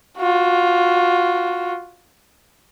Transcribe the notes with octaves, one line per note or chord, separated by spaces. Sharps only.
F4 F#4